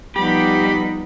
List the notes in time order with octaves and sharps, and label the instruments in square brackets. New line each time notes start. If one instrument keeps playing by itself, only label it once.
[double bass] F3 B3 [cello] G3 D#4 [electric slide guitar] G4 [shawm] B5